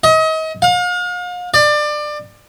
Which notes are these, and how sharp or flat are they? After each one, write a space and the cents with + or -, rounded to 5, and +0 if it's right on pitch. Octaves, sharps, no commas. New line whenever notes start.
D#5 +35
F5 +40
D5 +25